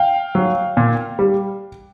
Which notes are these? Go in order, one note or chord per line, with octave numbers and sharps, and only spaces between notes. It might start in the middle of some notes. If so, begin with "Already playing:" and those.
Already playing: F5 G5
F#3
A#2
G3